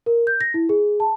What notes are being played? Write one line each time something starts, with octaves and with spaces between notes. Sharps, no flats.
A#4
G6
A#6
E4
G#4
A5